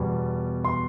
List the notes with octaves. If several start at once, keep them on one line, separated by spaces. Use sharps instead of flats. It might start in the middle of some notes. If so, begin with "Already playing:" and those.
Already playing: E2 B2 G3
C6